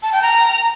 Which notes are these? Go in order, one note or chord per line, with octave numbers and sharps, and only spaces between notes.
A5
G5
A#5